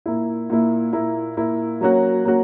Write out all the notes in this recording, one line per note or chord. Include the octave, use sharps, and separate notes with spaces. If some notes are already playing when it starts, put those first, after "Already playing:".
A#2 A#3 E4
A#2 A#3 E4
A#2 A#3 E4
A#2 A#3 E4
F#3 A#3 C#4 F#4
F#3 A#3 C#4 F#4